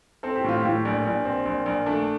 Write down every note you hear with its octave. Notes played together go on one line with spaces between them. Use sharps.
C4 A4
G4
A2 F4
G4
A2
A#1
A#1
C4
A#1
A#1
A3 D4